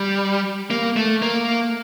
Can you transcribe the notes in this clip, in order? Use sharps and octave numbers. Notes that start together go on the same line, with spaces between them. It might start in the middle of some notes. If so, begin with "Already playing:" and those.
Already playing: G3
A#3
A3
A#3